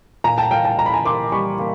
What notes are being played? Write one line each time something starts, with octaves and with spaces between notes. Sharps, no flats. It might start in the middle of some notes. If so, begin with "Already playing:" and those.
A#2 G#5 A#5
G5 A5
A#2 F5 G5
G5 A5
A#2 A#5
B5
G#5 A#5
A#3 C6 D6
G3 B5 C#6
A#3